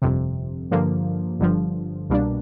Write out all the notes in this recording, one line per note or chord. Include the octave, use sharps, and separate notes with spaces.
G1 F2 C3
G2 D3 F3 A#3
G1 G2 D3 F3
C2 B2 G3 A#3 D4